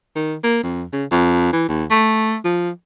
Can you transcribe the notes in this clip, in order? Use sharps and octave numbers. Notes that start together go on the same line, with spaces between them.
D#3
A#3
F2
C#3
F2
E3
D#2
A3
F3